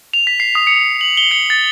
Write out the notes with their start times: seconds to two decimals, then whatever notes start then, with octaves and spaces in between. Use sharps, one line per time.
0.14 F7
0.27 B6
0.40 C7
0.55 D#6
0.67 C#7
1.01 F#7
1.17 G7
1.31 C#7
1.50 A6